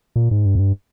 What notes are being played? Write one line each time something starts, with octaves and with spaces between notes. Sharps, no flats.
A#2
G#2
G2
F2
G2